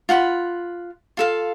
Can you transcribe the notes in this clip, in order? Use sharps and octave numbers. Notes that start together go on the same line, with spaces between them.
F4 F#5 A#5 B5
F4 A4 F5